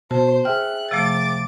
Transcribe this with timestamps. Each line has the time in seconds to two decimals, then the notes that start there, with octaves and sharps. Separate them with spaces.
0.11 B2 C5 A5
0.45 G#4 E5 G5 F6 F#6
0.91 C3 F3 A3 D6 A6